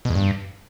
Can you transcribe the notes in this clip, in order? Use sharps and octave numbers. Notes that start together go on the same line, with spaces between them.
B2
E2
G2